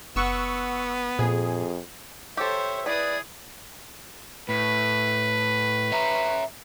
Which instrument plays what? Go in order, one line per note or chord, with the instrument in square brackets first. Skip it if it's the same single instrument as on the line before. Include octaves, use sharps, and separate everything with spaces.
[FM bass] F#1 [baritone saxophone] B3 [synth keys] F#5 C#6 E6
[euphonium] F2 [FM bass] A#2 [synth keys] G#4
[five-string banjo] G4 A4 [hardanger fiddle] C5 C#5 [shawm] E5
[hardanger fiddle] E4 D#6 [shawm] G#4 [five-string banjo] B4 [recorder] D5
[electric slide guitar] A2 [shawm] B4
[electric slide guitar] C#5 E5 A#5